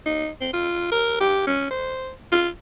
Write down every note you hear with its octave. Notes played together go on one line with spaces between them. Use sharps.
D#4
C4
F4
A#4
G4
C#4
C5
F4